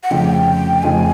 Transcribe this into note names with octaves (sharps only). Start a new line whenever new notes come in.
F#5
F1 F2 C#3 F3 A3 G5
F1 F2 C#3 F3 A3 G#5